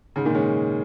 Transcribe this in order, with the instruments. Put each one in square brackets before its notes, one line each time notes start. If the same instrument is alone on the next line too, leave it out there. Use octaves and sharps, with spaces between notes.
[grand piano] G#2 C#3
A#2 D#3
G#3 C#4